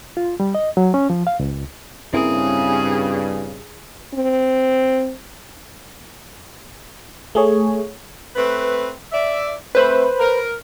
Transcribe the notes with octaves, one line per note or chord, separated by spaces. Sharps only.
F4
G3
D#5
F#3
C#4
F3
F5
C#2
G2 C#3 A#3 C4 C#4 E4 G#4 A#4
C4
A3 G#4 C#5
A3 C4 B4
D5 E5
A3 C4 B4 C5 B5
A#4